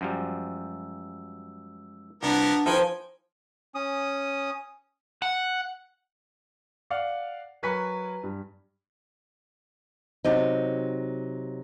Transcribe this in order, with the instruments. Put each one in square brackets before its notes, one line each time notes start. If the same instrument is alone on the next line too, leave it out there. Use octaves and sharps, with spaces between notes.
[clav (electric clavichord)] F#2 F3 G3 [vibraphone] G#3 E6
[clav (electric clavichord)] C2 [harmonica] F3 B3 A#4 [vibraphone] D4 F#5 A5
[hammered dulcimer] F3 [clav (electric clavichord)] D#4 A4 B4 [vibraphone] F4 [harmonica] G5 G#5
[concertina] C#4 D#6
[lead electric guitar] F#5
[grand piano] D5 F5 F#5
F#3 A#4 B4 G#5 C#6 B6
G2
[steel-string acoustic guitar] C3 F#3 D#4